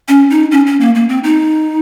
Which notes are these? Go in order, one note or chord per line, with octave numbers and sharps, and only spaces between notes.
C#4
D#4
C#4
C#4
A#3
A#3
C4
D#4